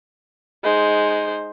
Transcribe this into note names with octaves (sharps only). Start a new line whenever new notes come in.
G#3 D#4 C5